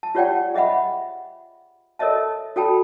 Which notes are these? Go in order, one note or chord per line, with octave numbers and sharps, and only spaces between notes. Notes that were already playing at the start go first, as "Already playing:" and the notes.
A5
F4 G4 C#5 D5 F#5 G5
G#4 D#5 E5 F#5 B5
A4 A#4 C#5 D#5 E5 A5
F#4 A4 G5 A5 B5